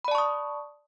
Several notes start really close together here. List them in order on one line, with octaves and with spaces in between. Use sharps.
B5 D5 A5 C#6 D#6